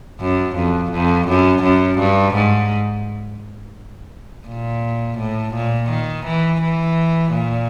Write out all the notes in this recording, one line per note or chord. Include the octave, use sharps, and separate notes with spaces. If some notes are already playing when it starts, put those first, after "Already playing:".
F#2
F2
F2
F#2
F#2
G2
G#2
A#2
A2
A#2
D#3
E3
E3
A#2